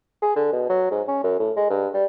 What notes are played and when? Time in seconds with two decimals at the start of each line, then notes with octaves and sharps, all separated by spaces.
0.22 G#4
0.36 D3
0.53 B2
0.70 F#3
0.91 G#2
1.08 C#4
1.24 F#2
1.40 A2
1.57 G#3
1.70 G2
1.94 G3